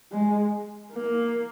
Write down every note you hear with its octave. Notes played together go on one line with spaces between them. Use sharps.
G#3
A#3